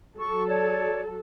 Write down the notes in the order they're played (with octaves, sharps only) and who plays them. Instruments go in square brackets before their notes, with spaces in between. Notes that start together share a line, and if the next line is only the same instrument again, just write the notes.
[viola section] F#3 A4 [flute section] C#6
[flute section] C#5 D5 A5